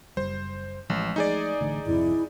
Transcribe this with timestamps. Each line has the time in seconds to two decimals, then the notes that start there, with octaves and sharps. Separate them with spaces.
0.17 F#1 G3 C5
0.90 A1 F3 G#3 A3
1.16 D#4 G#4 D5
1.61 A1 A2 D3
1.87 G#1 F2 C3 E4